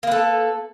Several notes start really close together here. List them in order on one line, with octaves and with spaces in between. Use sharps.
A#3 B4 A4